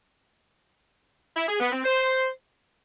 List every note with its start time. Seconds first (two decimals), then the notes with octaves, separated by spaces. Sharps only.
1.37 E4
1.49 G#4
1.60 B3
1.72 C4
1.84 C5